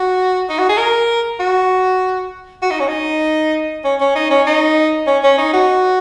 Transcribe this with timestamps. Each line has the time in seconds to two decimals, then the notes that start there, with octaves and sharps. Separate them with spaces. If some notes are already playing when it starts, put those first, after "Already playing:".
Already playing: F#4
0.49 D#4
0.59 F#4
0.69 G#4
0.78 A#4
1.40 F#4
2.62 F#4
2.71 D#4
2.80 C#4
2.88 D#4
3.84 C#4
4.00 C#4
4.15 D#4
4.31 C#4
4.46 D#4
5.07 C#4
5.23 C#4
5.38 D#4
5.53 F#4